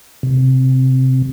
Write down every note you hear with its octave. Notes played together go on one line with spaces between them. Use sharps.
C3